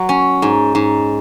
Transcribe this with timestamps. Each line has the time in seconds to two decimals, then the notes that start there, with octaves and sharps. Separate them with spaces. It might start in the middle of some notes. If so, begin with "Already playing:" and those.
Already playing: F#3
0.09 C#4
0.42 G#2
0.75 G#2